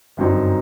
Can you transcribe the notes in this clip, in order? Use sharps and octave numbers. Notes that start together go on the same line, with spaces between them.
G1 F#2 F#3 C4 D#4